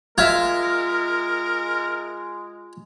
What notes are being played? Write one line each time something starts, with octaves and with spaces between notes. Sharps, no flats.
G#3 F4 A#4 E5 F6 G#6